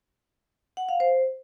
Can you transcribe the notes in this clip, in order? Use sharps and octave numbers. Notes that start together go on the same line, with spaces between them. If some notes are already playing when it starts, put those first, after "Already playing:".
F#5
F5
C5